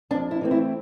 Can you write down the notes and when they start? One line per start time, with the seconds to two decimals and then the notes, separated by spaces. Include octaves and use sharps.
0.11 F2 D4
0.31 E4
0.41 E3 A3 C4
0.51 E4